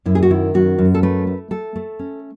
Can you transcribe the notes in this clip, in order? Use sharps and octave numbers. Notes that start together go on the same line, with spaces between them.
F#2 E4
G#4
F#4
D#3 E4
F#2 F#4
F#2
A4
A3 B4
A3
A3 A4
A3
C#4